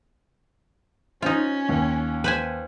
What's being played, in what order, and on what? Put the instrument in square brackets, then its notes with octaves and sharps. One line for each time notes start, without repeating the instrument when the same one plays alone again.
[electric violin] C#4 [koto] D#4 F4 [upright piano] C5
[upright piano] D#2
[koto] B4 C5 G#5